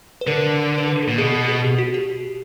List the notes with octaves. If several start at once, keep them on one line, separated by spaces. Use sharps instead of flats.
B4
D3 A#4
B4
A#4
A4
A#2
B2 G#4
G#4
G#4
G4
F#4
G4